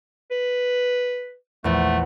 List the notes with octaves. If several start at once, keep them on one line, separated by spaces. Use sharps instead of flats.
B4
A#1 E2 A3